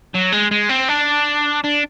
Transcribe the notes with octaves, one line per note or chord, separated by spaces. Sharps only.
F#3
G#3
G#3
C4
D4
D4